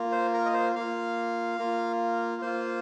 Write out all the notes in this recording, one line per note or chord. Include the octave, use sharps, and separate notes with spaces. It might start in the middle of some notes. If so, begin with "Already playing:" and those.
Already playing: A#3 F4
C5
A#4
D#5
C5
A#3 F4 F5
A#3 F4
A#3 F4 C5